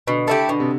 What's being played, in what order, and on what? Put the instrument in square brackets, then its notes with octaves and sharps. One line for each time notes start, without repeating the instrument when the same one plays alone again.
[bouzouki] B2 [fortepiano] D3
[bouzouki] A3 E4 G4
[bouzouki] B2 [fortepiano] D3
[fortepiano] C3